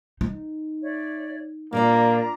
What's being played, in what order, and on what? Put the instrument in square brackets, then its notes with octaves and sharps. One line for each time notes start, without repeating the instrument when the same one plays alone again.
[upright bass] D#4
[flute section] C#5 D5 E5
[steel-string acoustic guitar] A#2 A#4 D5 [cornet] A#3 [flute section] D4 F4 A#5